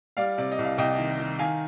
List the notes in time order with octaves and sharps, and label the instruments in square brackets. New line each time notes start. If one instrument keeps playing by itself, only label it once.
[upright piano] G3 D5 F5
C3 D5
D#5
C2
F5
C2 D#5 G5
D#3
D#3
D#3 F5 G#5